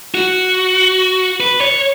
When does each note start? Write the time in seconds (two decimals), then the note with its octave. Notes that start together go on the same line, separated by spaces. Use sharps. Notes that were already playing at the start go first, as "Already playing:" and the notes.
0.14 F#4
1.40 B4
1.61 C#5